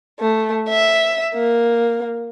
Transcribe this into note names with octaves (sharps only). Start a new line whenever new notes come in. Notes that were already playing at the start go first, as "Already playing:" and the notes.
A3
E5
A#3